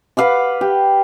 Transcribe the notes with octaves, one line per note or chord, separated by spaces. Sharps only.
B4 F5 F#5 D6
G4